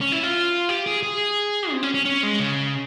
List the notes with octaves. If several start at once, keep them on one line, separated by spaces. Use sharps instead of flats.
C#4
E4
F4
G4
G#4
G#4
C4
C#4
C#4
C#4
G#3
C#3